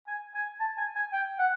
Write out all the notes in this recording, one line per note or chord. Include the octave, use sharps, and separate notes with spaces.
G#5
G#5
A5
G#5
G#5
G5
F#5